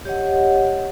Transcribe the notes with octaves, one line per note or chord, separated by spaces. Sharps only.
G4 C#5 D#5 F#5